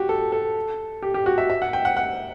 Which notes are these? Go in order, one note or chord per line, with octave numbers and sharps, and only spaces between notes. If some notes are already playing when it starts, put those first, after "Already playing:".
Already playing: F#4 G4
A4
A4
G4
G4
F#4
E5
E5
F#5
G5
F#5
F#5